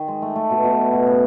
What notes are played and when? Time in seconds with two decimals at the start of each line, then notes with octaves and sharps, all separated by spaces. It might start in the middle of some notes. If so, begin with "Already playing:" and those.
Already playing: D#3
0.08 G#3
0.22 A3
0.36 A3
0.51 B2
0.64 B2
0.78 E4
0.93 B2
1.07 C#3